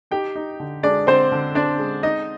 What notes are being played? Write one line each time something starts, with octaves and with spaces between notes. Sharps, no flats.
D#4 G4 G5
D#4
D3
G#3 D4 D5
D3 C4 C5
D3
C4 D4 D5
G#3
D#4 D#5